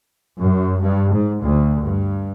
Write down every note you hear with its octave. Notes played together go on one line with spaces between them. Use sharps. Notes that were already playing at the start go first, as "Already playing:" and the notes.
F#2
G2
G#2
D2
G2